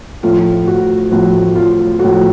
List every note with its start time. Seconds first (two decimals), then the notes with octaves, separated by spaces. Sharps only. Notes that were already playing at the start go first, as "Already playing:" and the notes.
0.23 A2 F3 A3 F4
0.67 F#4
1.11 A2 F3 A3 F#4
1.55 F4
1.99 A2 F3 A3 F#4